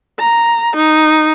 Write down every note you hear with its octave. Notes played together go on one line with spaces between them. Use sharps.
A#5
D#4